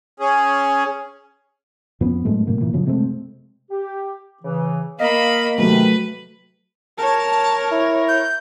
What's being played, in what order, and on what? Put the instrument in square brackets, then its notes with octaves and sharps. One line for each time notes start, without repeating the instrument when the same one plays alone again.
[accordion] C#4 G#4
[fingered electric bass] F2 B3 C#4
F#2 A2 G#3 A3
F#2 A2 C3 A#3
A#2 E3
F#2 C#3 F3 F#3
C3 G#3 A3 C4
[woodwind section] G4
C#3 E3
[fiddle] A#3 B5 [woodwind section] D#5 F5
[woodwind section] G#2 C3 D#3 [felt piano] F#3 A3 [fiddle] B4
[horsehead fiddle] A#4 C#5 [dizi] A5
[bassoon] E4
[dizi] G6